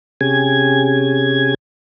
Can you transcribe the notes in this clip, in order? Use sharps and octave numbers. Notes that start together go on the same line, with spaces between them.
C3 C#4 G4 G#4 G#5 G#6